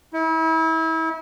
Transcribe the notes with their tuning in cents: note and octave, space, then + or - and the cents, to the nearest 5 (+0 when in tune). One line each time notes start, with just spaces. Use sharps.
E4 -35